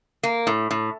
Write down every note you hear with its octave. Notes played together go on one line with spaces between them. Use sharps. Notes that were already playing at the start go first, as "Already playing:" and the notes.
A#3
A2
A2